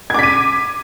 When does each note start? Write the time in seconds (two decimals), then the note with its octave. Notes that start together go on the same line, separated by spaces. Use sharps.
0.10 G#6
0.14 D6
0.19 B6
0.23 D#7